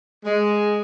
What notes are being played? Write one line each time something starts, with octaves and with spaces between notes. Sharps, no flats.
G#3